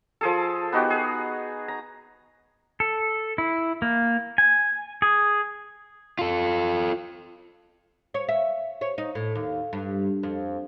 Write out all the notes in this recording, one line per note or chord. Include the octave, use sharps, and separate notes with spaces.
F3 G#4 A4
B3 D#4 F#4 G4
G#4
A#5
A4
E4
A#3
G#5
G#4
F4 A4
C#5
E5
C#5
D#4
A2
D#2
G2
F2